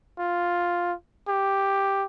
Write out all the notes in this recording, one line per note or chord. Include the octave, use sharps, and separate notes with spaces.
F4
G4